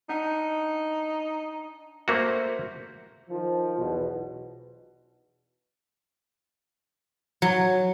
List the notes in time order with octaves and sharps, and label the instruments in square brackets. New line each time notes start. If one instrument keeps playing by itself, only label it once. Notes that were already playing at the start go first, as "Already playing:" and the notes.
[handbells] D4 F#5 [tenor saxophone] D#4
[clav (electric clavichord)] A3 A#3 F#4 [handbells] A#4 C5 E5
[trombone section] D#3 F3
B1 E2 B2
[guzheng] F#3